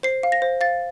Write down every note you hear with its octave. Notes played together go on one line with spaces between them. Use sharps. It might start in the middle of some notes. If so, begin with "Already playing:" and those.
C5 C7
F5
A#6
C5
F5 A6